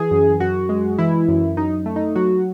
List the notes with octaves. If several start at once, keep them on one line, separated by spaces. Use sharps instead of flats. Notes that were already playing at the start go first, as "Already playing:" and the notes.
Already playing: E3 G#4
F#2
F#2 F#4
G#3
E3 E4
F#2
F#2 D#4
A3
D#4
F#3 F#4